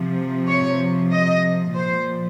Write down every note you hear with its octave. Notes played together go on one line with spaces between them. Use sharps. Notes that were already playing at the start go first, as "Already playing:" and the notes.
Already playing: C3 F3
C#5
D#5
A#2 F3 C5